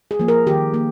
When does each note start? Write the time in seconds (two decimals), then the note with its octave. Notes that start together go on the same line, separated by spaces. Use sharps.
0.11 G#4
0.19 F3 A#3
0.28 A#4
0.46 D#3 G4
0.74 A#3